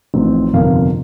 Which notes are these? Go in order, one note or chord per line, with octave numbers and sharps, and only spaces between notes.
A1 A2 F3 C4 D#4
G1 F2 C3 D#3 A#3 F5